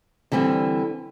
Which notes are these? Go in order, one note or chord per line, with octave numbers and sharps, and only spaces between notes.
D3 E3 G3 C4